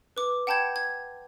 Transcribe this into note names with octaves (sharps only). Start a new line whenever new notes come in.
B4 D6
F#5 G5 A5 B5 G6 G#6
G#6